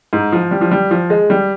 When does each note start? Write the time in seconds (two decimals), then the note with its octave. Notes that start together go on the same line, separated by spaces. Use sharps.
0.13 G#2
0.32 F3
0.51 G3
0.61 F3
0.71 G3
0.91 F3
1.10 G#3
1.30 G3